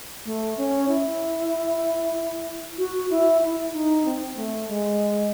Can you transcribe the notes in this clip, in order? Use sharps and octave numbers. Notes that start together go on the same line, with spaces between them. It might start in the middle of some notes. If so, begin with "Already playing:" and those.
A3
C#4
E4
F#4
E4
E4
D#4
C4
A3
G#3